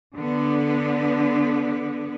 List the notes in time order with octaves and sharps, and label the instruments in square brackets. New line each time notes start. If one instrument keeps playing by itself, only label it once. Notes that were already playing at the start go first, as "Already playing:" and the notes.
[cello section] D3 B3